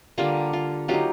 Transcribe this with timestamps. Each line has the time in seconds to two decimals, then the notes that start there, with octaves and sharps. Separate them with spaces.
0.18 D3 G3 A#3 F4
0.53 F4
0.88 F#3 A#3 D#4 F4 G4